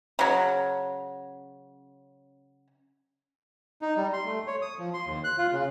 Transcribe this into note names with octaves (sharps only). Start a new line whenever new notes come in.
C#3 F#3
D#4
G3
C6
A3
C#5
D#6
F3
C6
D#2
F#6
F4
C#3